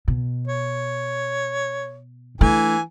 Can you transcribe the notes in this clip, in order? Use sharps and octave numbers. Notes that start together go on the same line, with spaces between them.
B2
C#5
E3 A3 D4 G#5